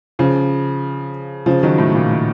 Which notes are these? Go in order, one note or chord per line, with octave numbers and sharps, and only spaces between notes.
C#3 F3
C#3 F3
D#3 F#3
A2
A#2
A2